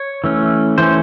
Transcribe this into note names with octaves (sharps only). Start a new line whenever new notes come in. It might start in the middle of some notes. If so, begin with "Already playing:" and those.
Already playing: C#5
E3 A3 C#4
E3 A3 C#4 C5